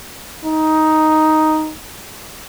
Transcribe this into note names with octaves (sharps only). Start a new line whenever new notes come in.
D#4